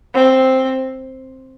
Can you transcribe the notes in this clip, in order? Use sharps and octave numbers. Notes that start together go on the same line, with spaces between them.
C4